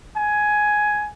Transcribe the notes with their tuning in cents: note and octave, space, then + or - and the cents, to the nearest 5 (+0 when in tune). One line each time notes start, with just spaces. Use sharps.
G#5 +10